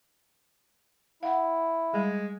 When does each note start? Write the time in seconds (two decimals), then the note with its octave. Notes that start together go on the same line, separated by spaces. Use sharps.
1.23 E4 F5 F#5
1.94 G3 G#3